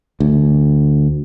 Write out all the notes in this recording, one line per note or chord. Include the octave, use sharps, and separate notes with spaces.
D2